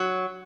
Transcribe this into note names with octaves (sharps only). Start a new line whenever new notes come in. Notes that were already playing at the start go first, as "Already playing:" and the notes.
Already playing: F#3